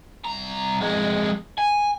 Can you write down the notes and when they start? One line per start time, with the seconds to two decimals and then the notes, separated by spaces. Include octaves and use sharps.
0.25 C2 A#5
0.80 F2 G#3
1.58 G#5